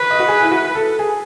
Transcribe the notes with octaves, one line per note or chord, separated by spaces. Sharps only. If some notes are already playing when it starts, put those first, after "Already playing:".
Already playing: B4
D#5
F#4
G#4
E4
F#4
A4
G#4